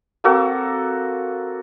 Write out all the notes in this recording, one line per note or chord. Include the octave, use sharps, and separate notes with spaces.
A#3 C4 F#4 A4